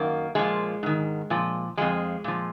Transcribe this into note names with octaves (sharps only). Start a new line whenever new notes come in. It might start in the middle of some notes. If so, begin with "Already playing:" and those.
Already playing: F#2 D#3 A#3
A#2 F3 G#3
G#2 D#3
A#2 F3
F2 F3 G#3
A#2 F3